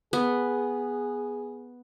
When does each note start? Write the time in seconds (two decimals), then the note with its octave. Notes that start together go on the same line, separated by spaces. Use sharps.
0.13 B3 G#4